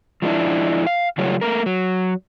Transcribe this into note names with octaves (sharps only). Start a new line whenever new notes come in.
F3 G#3 A3 D4 E4
F5
C#3 F#3 G3 A3 F4 C#5
A3 A#3 A#4
F#3